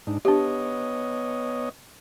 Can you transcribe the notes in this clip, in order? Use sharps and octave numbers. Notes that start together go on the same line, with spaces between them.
G#2 D4 D#4
B3 D4 G4 C#5 D#5